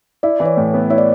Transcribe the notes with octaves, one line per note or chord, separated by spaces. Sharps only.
E4 D5
E3
C#5
A2
B3
E4 C#5
D5